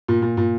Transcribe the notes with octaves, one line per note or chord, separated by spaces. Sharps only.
A#2
A#2
A#2